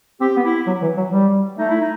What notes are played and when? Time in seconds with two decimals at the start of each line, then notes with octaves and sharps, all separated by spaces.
0.21 C4 G4
0.36 B3
0.44 E4
0.67 F#3
0.82 E3
0.97 F#3
1.12 G3
1.58 A3 D#4
1.70 E4
1.81 D#4